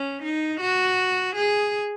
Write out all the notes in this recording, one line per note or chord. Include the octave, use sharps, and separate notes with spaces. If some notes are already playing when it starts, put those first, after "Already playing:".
Already playing: C#4
D#4
F#4
G#4